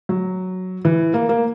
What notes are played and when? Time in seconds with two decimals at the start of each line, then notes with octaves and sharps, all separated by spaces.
0.09 F#3
0.85 E3
1.14 A#3
1.29 A#3